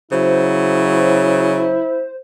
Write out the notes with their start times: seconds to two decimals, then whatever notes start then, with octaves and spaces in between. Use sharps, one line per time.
0.12 C#3 F#3 E4 C5